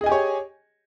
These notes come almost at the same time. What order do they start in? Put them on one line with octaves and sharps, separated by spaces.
G#4 D#5 G#5 G4 C#5